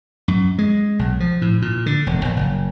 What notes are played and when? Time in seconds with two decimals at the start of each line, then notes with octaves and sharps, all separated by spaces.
0.28 F#2
0.58 G#3
0.99 B1
1.20 F3
1.42 A2
1.62 A#2
1.86 D3
2.07 E1
2.25 A#1
2.36 F#1